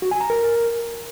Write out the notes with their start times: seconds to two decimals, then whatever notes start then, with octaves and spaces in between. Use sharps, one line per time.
0.02 F#4
0.11 G#5
0.21 A#5
0.30 A#4